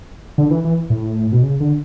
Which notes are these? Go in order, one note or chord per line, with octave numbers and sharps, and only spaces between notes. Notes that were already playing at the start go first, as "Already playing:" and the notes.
D3
E3
E3
A2
B2
C#3
D3